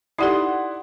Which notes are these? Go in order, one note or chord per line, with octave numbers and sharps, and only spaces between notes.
D#4 E4 G4 A4 D5 F#5 C6 D#6